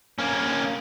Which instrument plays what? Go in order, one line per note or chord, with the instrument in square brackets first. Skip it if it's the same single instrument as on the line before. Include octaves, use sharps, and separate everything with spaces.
[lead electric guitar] A#3 C#4